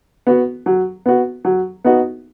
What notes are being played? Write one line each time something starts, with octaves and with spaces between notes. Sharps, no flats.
B3 F#4
F#3
B3 F#4
F#3
B3 D#4 F#4